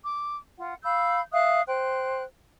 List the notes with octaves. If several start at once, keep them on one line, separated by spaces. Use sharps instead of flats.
D6
F4 F#5
F5 B5 E6 G6
E5 F5 D#6 F#6
C5 G5 F#6